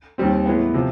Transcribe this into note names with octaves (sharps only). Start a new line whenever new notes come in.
D#2 D#3 G3 C4
A2 E3 G#3 B3
C3 F3